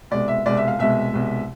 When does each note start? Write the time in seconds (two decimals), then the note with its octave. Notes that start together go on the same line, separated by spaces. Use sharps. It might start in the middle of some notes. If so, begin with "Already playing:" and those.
0.11 C2 B2 G#3 D5
0.28 E5
0.46 C2 B2 G#3 D5
0.57 E5
0.68 F5
0.79 C2 B2 G#3 E5
1.13 C2 B2 G#3